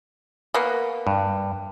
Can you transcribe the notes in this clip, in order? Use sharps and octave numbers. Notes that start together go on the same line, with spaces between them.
A#3 B3
G2